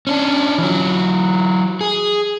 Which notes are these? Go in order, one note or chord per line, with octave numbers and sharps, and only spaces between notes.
C#4 D4
E3 F#3
G#4